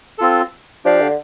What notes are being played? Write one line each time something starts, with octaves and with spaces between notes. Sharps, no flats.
C4 F4 A4
F3 D4 G4 D5 F5
D3